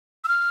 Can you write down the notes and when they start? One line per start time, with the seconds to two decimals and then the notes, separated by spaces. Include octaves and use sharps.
0.24 E6
0.28 F6